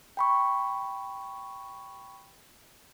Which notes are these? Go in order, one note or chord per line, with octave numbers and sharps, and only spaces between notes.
G5 B5 C#6